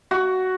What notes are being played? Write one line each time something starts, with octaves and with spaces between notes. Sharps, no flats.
F#4